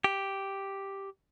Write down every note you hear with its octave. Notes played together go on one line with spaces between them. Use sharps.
G4